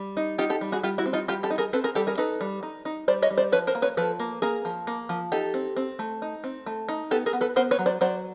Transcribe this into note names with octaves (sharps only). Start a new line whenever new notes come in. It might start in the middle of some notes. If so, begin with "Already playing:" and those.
Already playing: G3
D#4
D#4 F4 G4
G4 A4
G3
F#4 G#4
G3 F4 G4
E4 F#4
C4
D#4 F4
G3 F4 G4
G4 A4
D#4
G#4 A#4
C4 A4 B4
G#4 A#4
G3 G4 A4
G#4 A#4
D#4 A4 B4
G3
D#4
D#4
G3 C5 D5
C#5 D#5
G3
C5 D5
F3 B4 C#5
A#4 C5
A#3
B4 C#5
F3 A4 B4
A#3
A#3 G#4 A#4
F3
A#3
F3
D#4 G4 A4
C4
C4
A3
D#4
C4
A3
D#4
B3 G4 A4
G#4 A#4
B3
A4 B4
B3 A#4 C5
B4 C#5
F#3
C5 D5
F#3 C5 D5